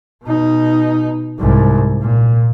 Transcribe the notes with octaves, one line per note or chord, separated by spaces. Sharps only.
B2 D#4
C2 G#2
A#2